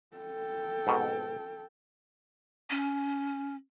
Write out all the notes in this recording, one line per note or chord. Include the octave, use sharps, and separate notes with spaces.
A4 G5
G#2 B2
C#4